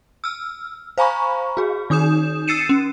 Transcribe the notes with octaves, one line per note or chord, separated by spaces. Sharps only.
E6 F6
C5 F5 G#5 A#5 B5 C#6
F#4 G#4
D#3 D#4 D#6 G6 E7
E6 A6 C7 C#7 D#7 E7
C#4